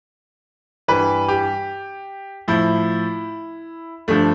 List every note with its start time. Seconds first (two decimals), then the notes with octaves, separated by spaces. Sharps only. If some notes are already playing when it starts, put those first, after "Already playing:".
0.88 G2 E3 G3 B4
1.28 G4
2.48 A2 F3 E4
4.08 G2 D3 F3 A3